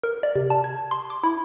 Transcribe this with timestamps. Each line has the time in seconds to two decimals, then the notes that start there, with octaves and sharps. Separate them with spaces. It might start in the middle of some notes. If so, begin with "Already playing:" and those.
0.03 A#4
0.23 D5
0.36 C3
0.50 A5
0.64 G#6
0.91 C6
1.10 D6
1.23 E4